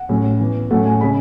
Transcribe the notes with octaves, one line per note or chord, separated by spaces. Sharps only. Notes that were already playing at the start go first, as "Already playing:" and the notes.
Already playing: F#5
A2 F#3 C#4
E3 B3
A2 F#3 A3 C#4 F#5
G#5
C#3 G#3 C#4 B5